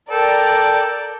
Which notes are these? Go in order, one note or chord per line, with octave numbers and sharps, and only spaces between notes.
A4 A#4 D5 G5